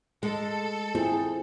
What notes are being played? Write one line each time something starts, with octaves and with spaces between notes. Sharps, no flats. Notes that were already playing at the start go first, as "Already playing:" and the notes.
G#3 A4
C4 E4 F4 G#4